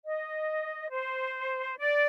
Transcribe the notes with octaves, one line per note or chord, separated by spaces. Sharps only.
D#5
C5
D5